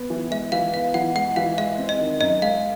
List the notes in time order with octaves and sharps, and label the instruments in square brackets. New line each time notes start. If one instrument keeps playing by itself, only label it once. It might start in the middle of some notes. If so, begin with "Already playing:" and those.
Already playing: [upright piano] B3
E3
[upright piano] G#3 [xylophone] E5
[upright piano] E3 [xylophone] F5
[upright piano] B3 [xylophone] F5
[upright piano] E3 [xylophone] F#5
[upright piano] G#3 [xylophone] F#5
[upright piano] E3 [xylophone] F5
[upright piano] G#3 [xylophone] E5
[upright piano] C4
[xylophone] D#5
[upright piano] D#3
[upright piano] F#2 [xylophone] D#5
[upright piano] G#3 [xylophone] F5